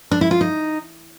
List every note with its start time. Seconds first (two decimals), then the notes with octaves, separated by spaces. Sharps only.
0.11 D4
0.21 E4
0.31 F4
0.41 D#4